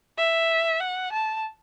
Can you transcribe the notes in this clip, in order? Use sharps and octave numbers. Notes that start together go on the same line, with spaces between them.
E5
F#5
A5